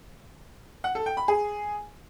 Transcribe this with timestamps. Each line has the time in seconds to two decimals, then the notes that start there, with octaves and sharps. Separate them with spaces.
0.84 F#5
0.95 A4
1.06 G5
1.17 B5
1.28 G#4